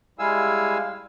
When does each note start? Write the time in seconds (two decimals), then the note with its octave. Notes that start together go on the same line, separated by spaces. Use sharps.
0.19 G3 G#3 E4 F5 G#5 E6